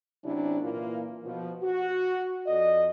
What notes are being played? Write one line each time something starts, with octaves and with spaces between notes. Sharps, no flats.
C3 F#3 C#4 D4 E4
A#2 E3 A#3 E4 F4
B2 F3
F#4
F2 D5 D#5